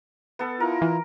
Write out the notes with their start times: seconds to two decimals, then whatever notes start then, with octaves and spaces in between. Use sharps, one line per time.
0.39 B3 A4
0.60 E4 F4 A#4
0.82 E3